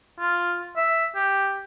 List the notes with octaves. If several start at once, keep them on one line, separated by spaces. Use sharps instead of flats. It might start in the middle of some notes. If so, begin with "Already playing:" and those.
F4
E5
G4